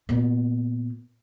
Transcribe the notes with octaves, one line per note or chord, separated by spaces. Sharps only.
A#2 B3